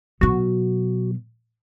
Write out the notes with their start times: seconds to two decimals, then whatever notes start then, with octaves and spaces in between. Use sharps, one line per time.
0.21 B2 F#3 F#4